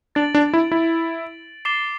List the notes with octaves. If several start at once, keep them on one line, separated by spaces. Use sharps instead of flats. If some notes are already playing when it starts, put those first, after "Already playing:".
D4 A6 D7 F#7
D4
E4
E4
D6 A6 C7 E7 G7